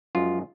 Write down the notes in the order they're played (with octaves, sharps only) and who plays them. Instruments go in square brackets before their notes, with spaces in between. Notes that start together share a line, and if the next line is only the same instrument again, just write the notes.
[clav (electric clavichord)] F#2 F3 G#3 F4